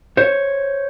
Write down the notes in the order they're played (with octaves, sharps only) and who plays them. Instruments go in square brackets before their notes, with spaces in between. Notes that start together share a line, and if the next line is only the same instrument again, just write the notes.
[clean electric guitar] C5 C#5